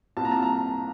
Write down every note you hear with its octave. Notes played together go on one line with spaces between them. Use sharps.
C2 A#2 A5 A#5
A5
A#5